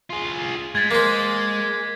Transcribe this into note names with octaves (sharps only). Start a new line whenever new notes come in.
F4 G#4
G#3 G#6 A6 B6
A#3 C5